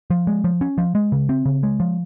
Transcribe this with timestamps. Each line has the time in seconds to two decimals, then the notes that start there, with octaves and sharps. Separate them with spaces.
0.10 F3
0.27 G#3
0.44 F3
0.61 C#4
0.78 F3
0.95 G#3
1.12 C#3
1.29 C4
1.46 C#3
1.63 G#3
1.80 F3